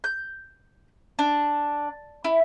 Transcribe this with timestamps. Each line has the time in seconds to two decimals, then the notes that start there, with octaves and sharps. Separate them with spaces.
0.04 G6
1.19 D4
2.24 E4